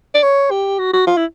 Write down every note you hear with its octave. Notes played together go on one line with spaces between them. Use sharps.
D5
C#5
G4
F#4
F#4
F4
E4